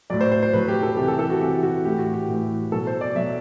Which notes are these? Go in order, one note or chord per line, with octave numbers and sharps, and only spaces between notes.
A2 F#3 D5
C5
C5
C5
A2 F#3 B4
G4
A4
C3 E3 G4
A4
A4
F#4
C3 E3 G4
F#4
A2 E3 G4
F#4
G4
A2 E3
B2 F#3 A4
C5
D5
B2 F#3 E5